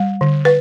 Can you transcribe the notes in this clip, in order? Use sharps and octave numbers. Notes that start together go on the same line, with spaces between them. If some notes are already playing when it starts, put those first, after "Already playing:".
Already playing: G3
D3
B4